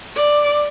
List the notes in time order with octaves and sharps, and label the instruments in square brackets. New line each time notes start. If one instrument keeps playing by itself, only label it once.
[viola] D5